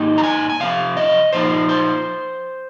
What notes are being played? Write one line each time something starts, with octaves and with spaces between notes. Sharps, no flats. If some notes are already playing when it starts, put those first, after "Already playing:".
Already playing: G#2 D#3 A#3 D#4
A#5
G#5
G#5
C3 F3 C4 F5
D#5
A#2 F3 A#3 D#4 C5
C5